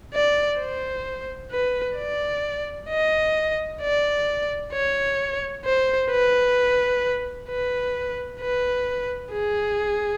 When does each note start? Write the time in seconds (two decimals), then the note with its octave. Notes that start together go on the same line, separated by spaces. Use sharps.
0.14 D5
0.60 C5
1.51 B4
1.97 D5
2.90 D#5
3.82 D5
4.73 C#5
5.65 C5
6.12 B4
7.49 B4
8.41 B4
9.33 G#4